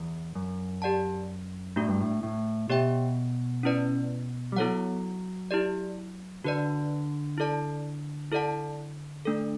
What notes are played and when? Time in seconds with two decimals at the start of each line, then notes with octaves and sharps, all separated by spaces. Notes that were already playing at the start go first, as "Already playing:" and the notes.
Already playing: E2
0.35 F#2
0.82 G4 D5 F#5 A5
1.76 A2 A3 D4 F#4
1.88 G2
2.01 A2
2.23 A2
2.70 B2 G4 C#5 E5 G5
3.63 C#4 E4 B4 D5
4.52 G3
4.57 F#3 B3 E4 A4 C#5 F#5
5.51 E4 G4 D5
6.44 D3 F#4 B4 D5
7.38 E4 A4 D5 A5
8.32 E4 A4 D5 F#5 A5
9.25 A3 D4 A4